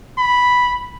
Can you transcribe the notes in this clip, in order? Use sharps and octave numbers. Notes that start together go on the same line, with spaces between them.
B5